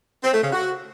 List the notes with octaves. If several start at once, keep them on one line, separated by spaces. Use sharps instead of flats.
C4
A3
C#3
F#4